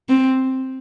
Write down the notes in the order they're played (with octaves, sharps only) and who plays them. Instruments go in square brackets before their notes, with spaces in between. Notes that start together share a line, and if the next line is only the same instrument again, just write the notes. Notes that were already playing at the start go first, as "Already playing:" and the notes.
[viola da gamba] C4